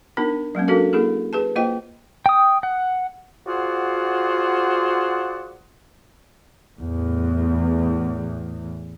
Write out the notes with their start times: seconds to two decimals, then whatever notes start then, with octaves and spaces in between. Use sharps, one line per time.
0.17 B3 D4 D#4 A#4
0.55 F#3 G#3 A#3 C#4
0.68 D4 F#4 A4 A#4 F5
0.93 A#3 E4 G#4 A4
1.33 G#4 B4 A5
1.56 A#3 F4 C5 D#5 G5
2.26 G5 D#6
2.63 F#5
3.46 F4 F#4 G#4 C5 D5 F#5
6.81 E2 A2